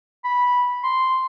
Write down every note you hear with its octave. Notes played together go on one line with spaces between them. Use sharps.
B5
C6